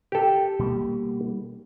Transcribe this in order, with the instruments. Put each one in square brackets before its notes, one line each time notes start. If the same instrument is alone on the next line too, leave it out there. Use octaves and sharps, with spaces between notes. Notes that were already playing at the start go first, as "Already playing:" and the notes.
[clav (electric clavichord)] G4 A4
[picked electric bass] B2 G3 A#3